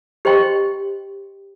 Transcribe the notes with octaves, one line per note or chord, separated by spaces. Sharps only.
G4 C5 D#5 G5 C6